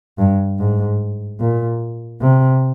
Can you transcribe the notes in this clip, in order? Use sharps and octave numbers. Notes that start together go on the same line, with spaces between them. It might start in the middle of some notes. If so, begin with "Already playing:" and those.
G2
G#2
A#2
C3